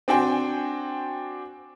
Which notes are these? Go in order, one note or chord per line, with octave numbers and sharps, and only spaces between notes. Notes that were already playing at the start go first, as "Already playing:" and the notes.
C4 D4 F#4 G5 G#5 C6